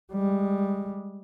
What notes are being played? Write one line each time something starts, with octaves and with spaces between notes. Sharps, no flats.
G3 G#3